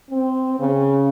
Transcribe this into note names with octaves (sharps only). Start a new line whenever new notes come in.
C4
C#3